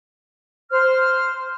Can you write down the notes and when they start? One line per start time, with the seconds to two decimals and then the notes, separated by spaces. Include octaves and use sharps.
0.70 C5 F6